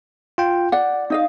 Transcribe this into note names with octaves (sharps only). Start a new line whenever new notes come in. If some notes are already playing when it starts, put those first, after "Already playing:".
F4 G5
D5 F#5
D#4 D#5 F5